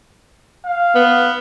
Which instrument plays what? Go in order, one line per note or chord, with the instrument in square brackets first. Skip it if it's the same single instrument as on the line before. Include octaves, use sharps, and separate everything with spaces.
[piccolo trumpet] F5
[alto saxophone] B3